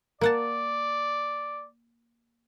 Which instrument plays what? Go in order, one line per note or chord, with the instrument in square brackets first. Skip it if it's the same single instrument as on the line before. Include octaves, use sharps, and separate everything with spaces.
[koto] A#3 F#5 A5 [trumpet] D5